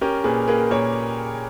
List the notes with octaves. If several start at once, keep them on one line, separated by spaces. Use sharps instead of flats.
C#4 G4 A#4
A#2 G#4 B4
A#3 G#4 B4
A#2 A#4 C#5